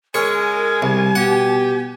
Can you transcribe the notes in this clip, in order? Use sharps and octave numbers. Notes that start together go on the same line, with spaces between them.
C#3 G#3 A#4 C#5 G#5
C2
B2 G4 F#5